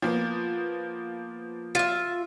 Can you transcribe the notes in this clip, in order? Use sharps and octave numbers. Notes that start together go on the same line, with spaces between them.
F3 A#3 B3
F4 E5